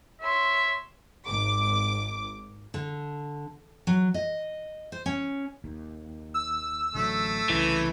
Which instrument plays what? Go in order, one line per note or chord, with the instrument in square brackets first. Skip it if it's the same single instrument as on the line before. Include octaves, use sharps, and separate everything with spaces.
[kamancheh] C#5 C6 [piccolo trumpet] E5
[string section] G#1 D6
[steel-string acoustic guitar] D3
F#3
D#5
C5
C#4
[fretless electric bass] D#2
[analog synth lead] E6
[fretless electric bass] A1 D3 F#3 [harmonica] A3
[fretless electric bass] C2 C#3 [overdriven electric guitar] E3